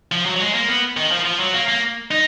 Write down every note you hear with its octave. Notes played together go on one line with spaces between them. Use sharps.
F3
F#3
F#3
G#3
A#3
B3
D#3
F3
F3
F#3
A#3
A#3
D#4